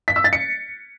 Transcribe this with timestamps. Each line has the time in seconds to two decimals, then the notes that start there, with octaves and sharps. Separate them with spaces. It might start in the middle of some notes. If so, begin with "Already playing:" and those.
0.08 B6
0.16 E6
0.24 A6
0.33 C#7